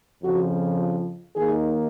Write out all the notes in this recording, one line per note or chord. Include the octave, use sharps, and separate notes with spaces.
F2 C#3 F3 F#4
F4
D#2 D#3 A#3 D#4 G#4